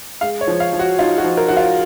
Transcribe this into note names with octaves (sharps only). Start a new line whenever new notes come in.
G#3 F5
C#5
F3
F5
F3
F#4
D#4 F4
F#4
F3
A#4
F3 F#4
F4